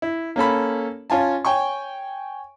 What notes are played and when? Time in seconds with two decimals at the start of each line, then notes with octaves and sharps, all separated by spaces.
0.02 E4
0.36 A#3 C#4 A4 B5
1.10 C#4 F4 G#5 A5
1.45 C#5 G5 G#5 C#6